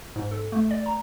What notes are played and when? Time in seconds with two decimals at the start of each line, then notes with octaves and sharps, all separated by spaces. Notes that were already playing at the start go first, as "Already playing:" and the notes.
0.16 G#2
0.31 A4
0.52 A3
0.71 D5
0.86 A#5